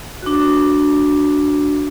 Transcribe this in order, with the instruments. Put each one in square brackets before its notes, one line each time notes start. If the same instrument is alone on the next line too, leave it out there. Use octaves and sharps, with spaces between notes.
[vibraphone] D4 F#4